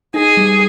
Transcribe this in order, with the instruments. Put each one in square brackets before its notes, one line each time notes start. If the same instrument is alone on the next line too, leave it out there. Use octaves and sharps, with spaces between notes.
[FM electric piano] D#4 [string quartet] G#4
[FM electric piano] G3